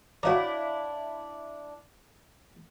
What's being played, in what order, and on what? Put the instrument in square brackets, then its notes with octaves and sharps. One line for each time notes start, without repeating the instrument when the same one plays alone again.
[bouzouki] D4 E4 [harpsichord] F#4 D#5 A#5 [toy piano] C#5 F5 D6